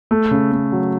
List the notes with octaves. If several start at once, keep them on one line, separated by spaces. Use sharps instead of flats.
A3
C#3
A3
F#3